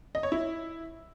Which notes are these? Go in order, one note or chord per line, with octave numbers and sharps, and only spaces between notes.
D#5
C#5
E4